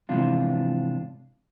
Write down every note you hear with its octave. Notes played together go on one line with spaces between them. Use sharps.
G#2 C3 E3 F3 D4 F4